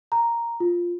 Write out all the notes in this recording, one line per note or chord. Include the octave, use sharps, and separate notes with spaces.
A#5
F4